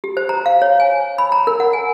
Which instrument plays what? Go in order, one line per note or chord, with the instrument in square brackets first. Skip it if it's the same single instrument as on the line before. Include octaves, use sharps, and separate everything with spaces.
[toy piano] G4
C5
A#5
F5
C#5
G#5
B5
A#5
A#4
F#5
G#5